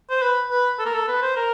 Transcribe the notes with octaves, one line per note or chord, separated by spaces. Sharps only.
C5
B4
B4
A4
A#4
A4
B4
C5
A#4